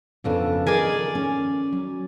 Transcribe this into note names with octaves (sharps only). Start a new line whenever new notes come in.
F2 C#3 F3 B3 D4 A4
D#3 G#4 A#4 D5 D#5 G#5
C#4
F#3